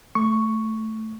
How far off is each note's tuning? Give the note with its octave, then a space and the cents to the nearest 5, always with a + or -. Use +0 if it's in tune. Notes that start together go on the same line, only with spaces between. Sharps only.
A3 +0 C#6 +0